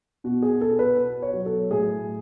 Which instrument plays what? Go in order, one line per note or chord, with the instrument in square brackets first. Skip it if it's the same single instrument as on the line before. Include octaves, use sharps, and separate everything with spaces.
[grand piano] B2 F#4
G#4
B3 A4
B4
B2
C#5
F#3
A4
A2 G#4